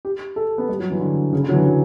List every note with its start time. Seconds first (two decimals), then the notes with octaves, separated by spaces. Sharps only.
0.05 G4
0.36 A4
0.58 B3
0.69 G3
0.80 F#3
0.90 E3
1.00 D3
1.33 C#3
1.43 D3
1.49 F#3
1.53 E3
1.65 F#3